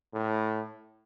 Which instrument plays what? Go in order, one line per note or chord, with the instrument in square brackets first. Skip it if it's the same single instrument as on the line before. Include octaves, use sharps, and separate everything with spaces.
[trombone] A2